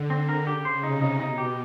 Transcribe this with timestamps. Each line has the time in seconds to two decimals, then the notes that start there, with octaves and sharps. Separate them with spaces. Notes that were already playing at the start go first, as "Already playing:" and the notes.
Already playing: D3
0.10 C4
0.29 A#4
0.47 C#3 G4
0.65 C5
0.83 C3 D#4
1.02 D#4
1.19 B2 D#4
1.38 G4